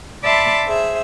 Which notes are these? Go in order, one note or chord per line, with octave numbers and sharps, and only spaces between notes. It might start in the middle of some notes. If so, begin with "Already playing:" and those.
D5 E5 A5 B5 C6
G#4 C5 E5